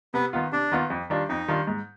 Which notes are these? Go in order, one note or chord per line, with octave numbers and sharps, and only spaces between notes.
C3 B3
D#3 B3 F4
C3 D4
D#3 B3 F4
F2
D#3 G3 D4 F4
F2 D#4
D#3 G3 D4 F4
G#2